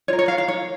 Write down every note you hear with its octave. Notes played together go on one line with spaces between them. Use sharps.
F4 A#4 C#5
C#5
F5
F5
C#5